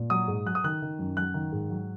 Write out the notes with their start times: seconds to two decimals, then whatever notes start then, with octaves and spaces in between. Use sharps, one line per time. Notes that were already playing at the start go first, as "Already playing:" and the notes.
Already playing: A#2
0.10 F#3 D#6
0.28 G#2
0.46 F#3 F#6
0.55 D#6
0.64 D#3 F#6
0.82 D#3
0.99 F#2
1.17 F#3 F#6
1.34 D#3
1.52 G#2
1.70 F#3